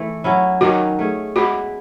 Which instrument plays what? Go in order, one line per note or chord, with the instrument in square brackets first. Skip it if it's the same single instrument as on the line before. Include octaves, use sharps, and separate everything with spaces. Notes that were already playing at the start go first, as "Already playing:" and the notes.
Already playing: [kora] E3 A3
F#3 C#4 E4
[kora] D#3 F#3 C#4 [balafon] F#4
[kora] A3 C#4 G#4
[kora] G#3 B3 E4 B4 [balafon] F#4